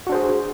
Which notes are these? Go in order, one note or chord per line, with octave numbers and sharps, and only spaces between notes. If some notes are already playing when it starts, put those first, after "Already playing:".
D4 F#4 G#4 C5